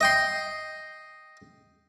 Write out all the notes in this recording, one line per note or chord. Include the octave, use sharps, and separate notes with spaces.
D#5 G5 C6